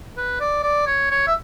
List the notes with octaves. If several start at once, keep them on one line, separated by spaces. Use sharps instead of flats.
B4
D5
D5
C#5
C#5
E5